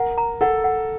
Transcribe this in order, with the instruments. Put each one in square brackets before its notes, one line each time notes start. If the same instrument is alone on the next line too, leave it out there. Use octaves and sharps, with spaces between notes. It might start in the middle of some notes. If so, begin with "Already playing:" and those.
Already playing: [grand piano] A#4 [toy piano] F#5
[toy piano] A#5
[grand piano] A4 [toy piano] F#5
[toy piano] F#5